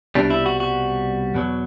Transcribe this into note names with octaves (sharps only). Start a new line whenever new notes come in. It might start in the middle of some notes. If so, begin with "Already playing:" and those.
C2 B2 G3 D4
E4
F#4
F#4
E2 B2 F#3